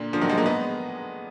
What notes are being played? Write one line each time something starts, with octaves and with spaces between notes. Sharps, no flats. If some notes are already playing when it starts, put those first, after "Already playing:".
Already playing: A#2 D3
D3 F3
D#3 F#3
F3 G#3
F#3 A#3
G#3 B3